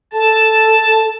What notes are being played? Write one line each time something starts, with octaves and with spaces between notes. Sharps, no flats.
A4 A5